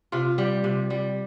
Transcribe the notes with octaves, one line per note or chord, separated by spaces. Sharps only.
C3 F4
G3 G4
C3
G3